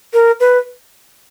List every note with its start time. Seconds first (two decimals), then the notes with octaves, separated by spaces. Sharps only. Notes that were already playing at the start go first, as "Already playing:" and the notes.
0.13 A#4
0.40 B4